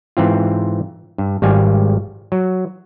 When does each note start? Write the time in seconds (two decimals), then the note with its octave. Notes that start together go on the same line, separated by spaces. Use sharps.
0.17 G#2 E3 C4 F4
1.18 G2
1.42 G#1 G3 F5 G#5
2.32 F#3